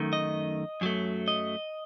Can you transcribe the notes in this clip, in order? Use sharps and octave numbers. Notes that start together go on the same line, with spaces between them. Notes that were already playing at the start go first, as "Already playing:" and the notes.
Already playing: F#2 D#3 A3
D#5
F#2 F#3 A3
D#5